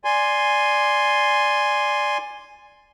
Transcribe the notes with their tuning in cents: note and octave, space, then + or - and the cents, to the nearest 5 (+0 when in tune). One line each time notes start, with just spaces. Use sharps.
D5 +0 G#5 +0 C6 +0